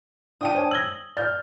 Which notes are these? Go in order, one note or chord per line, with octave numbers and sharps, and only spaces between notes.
D4 G5 A5 D#6 D#7
C5 C#5 G#5
E6 G#6 A#6 F#7 G7
D5 F6 G6 A6